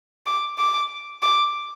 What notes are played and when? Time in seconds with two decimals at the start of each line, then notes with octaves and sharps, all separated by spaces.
0.26 D6
0.58 D6
1.23 D6